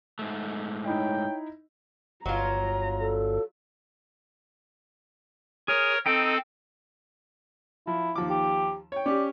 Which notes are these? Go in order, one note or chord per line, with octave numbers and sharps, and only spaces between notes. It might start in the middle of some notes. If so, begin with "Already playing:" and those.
G#2 A3
D#4 E4 C#5 D#5 G5
G1 F#3 F4 A#5
A4
G#4 A#4 C#5
C4 D#4 A4 G5
F3 E4
D#2 F3 D6
G4
C#5 G5
C#4 G4 D5